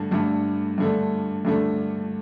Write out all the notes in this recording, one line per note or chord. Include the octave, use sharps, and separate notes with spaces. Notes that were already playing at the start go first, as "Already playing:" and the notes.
Already playing: G2 D3 A3
G2 D3 A3
G2 D3 A3
G2 D3 A3